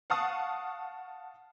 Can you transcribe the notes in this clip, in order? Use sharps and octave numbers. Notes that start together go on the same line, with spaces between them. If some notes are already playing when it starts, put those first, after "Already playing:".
F5 F#5 A5 C#6 D#6